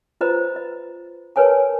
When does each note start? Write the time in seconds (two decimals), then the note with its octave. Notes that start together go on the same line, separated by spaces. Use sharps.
0.21 F4 B4 C5 D#5 A#5 B5
0.56 D#5
1.36 A#4 B4 C#5 G#5 A5